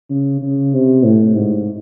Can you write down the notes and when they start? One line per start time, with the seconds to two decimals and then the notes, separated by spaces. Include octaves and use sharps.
0.10 C#3
0.42 C#3
0.73 C3
1.04 A2
1.36 G#2